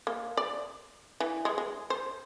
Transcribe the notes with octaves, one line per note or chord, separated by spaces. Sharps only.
A#3
D5
E3
G#3
G#3
C5